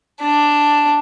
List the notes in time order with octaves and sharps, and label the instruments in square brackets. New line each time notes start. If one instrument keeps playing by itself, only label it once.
[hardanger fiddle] D4